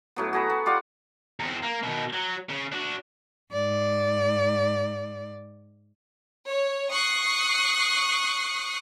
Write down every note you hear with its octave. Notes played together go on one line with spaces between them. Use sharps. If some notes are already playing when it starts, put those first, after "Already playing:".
A2 F#3 B3
F#4 G#4 A#5 B5
B3
F4 G4 D5 F#5
E2 C4
A#3
B2 D#3
F#3
C#3
D4 F#4
G#2 D5
C#5
C#6 D#6 F#6 C7